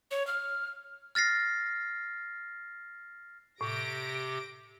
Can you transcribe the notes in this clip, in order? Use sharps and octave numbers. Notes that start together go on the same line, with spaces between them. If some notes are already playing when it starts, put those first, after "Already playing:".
C#5
F6
F6 A6 A#6 C7
A2 C3 G4 A#6 D7